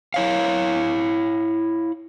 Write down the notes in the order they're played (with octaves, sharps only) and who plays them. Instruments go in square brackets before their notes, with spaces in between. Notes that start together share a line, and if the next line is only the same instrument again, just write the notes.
[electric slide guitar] E4 C#5 F5